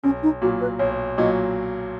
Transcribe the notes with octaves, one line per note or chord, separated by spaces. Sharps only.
B1 C#4
D#4
A#2 F#3 F#4
B4
B1 C#5
A#2 F#3 D#5